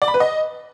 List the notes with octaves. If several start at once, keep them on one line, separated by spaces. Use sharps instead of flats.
D5
B5
B4
D#5